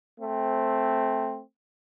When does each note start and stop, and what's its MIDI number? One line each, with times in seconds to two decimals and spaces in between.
0.20 1.41 57
0.20 1.41 60